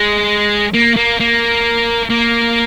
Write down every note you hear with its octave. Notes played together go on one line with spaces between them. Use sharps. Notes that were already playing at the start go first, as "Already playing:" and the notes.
Already playing: G#3
A#3
A#3
A#3
A#3